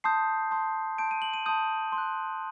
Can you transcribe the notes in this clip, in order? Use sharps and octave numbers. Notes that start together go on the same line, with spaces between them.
A5 C6 D#6 G6 C7
A5 C6 D#6 G6
A5 C6 D#6 G6 D7
D#7
F#7
D#7
A5 C6 D#6 G6 D#7
C6
F#6